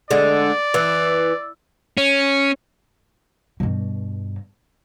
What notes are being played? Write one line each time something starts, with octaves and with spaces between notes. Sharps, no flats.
D3 G#3 D5
E3
C#4
G2 B2